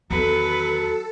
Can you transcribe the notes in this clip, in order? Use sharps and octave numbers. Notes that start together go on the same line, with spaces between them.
E2 D#3 F#3 A4 B4